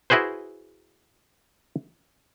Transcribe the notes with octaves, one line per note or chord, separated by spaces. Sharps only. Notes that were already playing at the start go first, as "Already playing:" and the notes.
E4 F#4 G#4 B4 C5